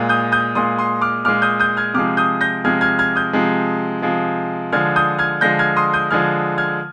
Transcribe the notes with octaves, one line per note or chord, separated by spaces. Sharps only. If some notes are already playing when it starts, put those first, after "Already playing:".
Already playing: A#2 G#3
D#6 G6
D#6 G6
A#2 G#3 C6 D#6
C6 D#6
D6 F6
A#2 G#3 D6 F6
D#6 G6
D#6 G6
F6 G#6
C3 F3 G#3 D6 F6
D#6 G6
G6 A#6
C3 F3 G#3 F6 G#6
F6 G#6
F6 G#6
D#6 G6
C3 F3 G#3
C3 F3 G#3
D3 F3 G#3 F6 G#6
D#6 G6
F6 G#6
D3 F3 G#3 G6 A#6
F6 G#6
C6 D#6
D#6 G6
D3 F3 G#3 F6 G#6
F6 G#6